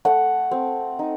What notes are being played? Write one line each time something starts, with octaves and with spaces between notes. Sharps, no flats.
A3 F#5
C4
D#4